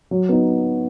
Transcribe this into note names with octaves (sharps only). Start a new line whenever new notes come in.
F#3
B3 D#4